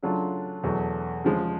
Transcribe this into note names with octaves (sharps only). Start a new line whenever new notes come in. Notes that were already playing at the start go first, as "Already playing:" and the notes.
C#3 F#3 A3 D4 F4
E2 B2 F#3 A3
C#3 F3 G#3